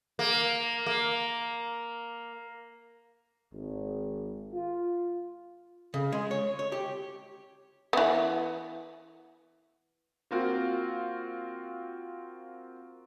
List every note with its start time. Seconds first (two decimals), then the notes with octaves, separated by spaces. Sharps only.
0.19 A#3
0.86 A#3
3.52 G#1
4.52 F4
5.94 C#3
6.12 G#3
6.31 C#5
6.59 C#5
6.72 G4
7.93 E3 B3
10.31 A#3 C4 F4 F#4